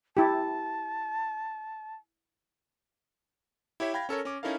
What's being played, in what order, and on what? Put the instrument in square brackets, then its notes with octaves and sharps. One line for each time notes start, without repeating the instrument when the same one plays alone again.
[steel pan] E4 G4 [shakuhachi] A5
[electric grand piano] E4 G4 C#5 E5
F5 G5 B5 G#6 A#6
C#4 A4 A#4 C#5
C#4 D6
C#4 D#4 E4 A4 A#4 F5